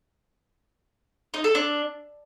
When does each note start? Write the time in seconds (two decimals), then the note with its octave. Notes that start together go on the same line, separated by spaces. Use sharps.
1.34 D#4
1.44 A4
1.55 D4